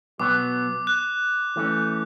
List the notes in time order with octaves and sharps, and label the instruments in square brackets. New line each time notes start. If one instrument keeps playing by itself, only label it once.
[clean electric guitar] B2 F#3 B3 [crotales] D6
[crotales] F#6
[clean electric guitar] E3 A3 C#4